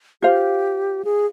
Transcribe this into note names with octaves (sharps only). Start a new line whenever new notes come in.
F4 G4 C5 F5
G#4